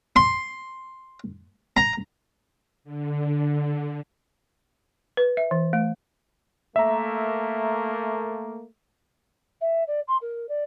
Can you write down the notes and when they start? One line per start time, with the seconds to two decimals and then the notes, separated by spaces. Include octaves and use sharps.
0.16 C6
1.77 A#5
2.84 D3
5.17 B4
5.37 E5
5.51 E3
5.73 A3
6.76 A3 A#3 E5 A#5
9.61 E5
9.87 D5
10.08 C6
10.21 A#4
10.49 D5